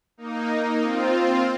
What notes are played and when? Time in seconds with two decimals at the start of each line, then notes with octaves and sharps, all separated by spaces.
0.17 A#3 D#4
0.82 C4 F4